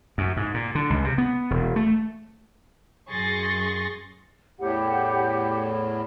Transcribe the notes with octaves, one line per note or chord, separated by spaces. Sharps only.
F#2
G#2
A#2
D3
C#2
C3
B3
E1
A3
F#2 G#4 C6 C#6 A6 A#6
E2 A2 G4 F#5